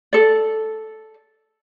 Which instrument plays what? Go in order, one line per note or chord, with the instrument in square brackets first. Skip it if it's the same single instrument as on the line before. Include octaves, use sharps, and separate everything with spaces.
[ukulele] A4 D5